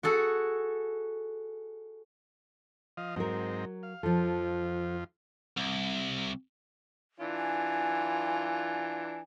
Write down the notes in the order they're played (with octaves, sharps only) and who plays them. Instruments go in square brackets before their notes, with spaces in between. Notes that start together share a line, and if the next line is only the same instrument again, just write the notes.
[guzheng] F#4 G#4 A4 F#5
[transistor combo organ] F3 D#5 F5
[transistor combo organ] G#2 C4 D#4 [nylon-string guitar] F#3 A#4
[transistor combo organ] F5
[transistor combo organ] F2 F4 [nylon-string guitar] F3 A4
[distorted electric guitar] C2
[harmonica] E3 D4 F4
[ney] G#5